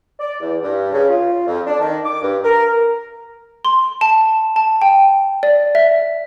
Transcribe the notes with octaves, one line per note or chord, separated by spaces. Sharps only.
D5
E2
G2
C#3
F4
F2
D4
D#3
D6
G2
A#4
C6
A5
A5
G5
D5
E5